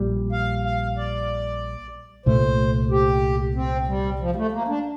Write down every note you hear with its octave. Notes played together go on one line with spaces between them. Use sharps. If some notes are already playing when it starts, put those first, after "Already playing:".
Already playing: A#1 A#2 G3
F5
F5
D5
C2 A#2 A3 C5
G4
C4
G3
F3
G3
A3
A#3
D4